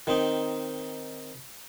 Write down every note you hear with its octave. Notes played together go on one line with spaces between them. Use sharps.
D#3 C4 D#4